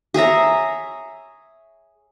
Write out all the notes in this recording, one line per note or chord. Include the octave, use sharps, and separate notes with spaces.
G#4 C#5 E5 A#5